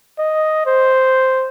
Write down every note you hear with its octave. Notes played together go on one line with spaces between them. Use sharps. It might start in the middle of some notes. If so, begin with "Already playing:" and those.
D#5
C5